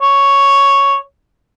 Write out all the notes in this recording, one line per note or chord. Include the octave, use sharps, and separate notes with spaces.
C#5